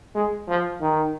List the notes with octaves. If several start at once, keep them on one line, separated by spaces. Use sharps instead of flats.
G#3
F3
D#3